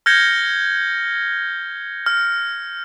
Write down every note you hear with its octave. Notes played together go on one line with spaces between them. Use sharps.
F6 G6 G#6 A#6 C#7 G7
F6